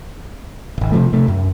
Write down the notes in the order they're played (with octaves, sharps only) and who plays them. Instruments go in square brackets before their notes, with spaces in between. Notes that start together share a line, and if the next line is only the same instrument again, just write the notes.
[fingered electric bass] D1 G#1
C3 F3 A3
C3 A3
F#2